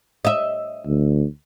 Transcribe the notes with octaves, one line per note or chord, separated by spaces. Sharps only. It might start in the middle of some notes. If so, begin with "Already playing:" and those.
D#5 E5
D2